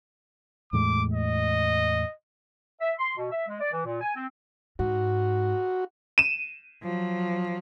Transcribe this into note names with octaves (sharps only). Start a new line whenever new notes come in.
E2 A2 G#3 D6
D#5
E5
C6
B2
E5
G#3
D5
E3
A#2
G#5
C4
G#2 F#4
D#7 E7
F3 F#3